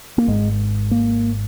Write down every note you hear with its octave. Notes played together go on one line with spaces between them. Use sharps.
A#3
G#1 G#2 G#3
A#3